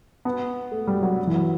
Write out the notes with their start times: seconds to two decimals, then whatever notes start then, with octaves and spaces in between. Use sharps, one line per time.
0.25 B3
0.72 A3
0.87 G3
1.03 F#3
1.27 E3
1.34 F#3